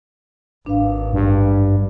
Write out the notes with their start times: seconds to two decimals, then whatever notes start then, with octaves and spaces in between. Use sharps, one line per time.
0.66 G#1 D4 B4 F5
1.13 G2